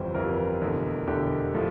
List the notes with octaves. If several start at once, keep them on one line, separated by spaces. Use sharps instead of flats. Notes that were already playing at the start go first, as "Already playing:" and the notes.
Already playing: G1 F2 E3 G3 C5
G1 F2 E3 G3 A#4
E1 E2 D3 A3
E1 E2 D3 A3 G4
A2 F3 A3